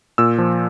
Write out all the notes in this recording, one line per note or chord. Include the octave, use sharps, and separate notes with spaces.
A#2 E6
F3